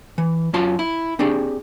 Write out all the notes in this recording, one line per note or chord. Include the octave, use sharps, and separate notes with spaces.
E3
F#2 C#4 F4 A5 C6
E4
C4 D4 G4 G#4